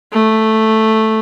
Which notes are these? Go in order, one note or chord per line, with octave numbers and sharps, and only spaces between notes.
A3